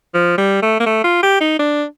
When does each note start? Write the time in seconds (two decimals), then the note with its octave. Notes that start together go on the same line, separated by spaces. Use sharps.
0.14 F3
0.38 G3
0.62 A3
0.80 A#3
0.86 A3
1.04 F4
1.23 G4
1.40 D#4
1.59 D4